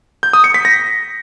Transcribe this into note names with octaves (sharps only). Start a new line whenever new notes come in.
G6
D#6
C#7
B6
A#6